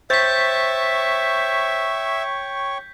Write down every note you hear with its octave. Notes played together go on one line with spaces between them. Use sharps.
C5 C#5 E5 G5 C#6 G6 A6 B6